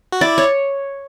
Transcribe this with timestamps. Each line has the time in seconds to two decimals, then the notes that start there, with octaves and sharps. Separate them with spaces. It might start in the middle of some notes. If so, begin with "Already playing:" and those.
0.12 F#4
0.21 E4 D5
0.38 C#5